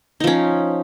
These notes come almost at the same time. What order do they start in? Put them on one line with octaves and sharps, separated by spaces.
D#4 F3 C#4